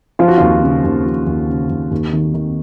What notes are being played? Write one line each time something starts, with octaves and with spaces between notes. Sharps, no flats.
F3 F4
F#4
D#2 F4
C#3
D#2
F3
D#2
C#3
D#2
D#2
D#3
D#3